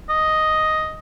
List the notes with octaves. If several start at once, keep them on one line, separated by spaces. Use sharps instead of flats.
D#5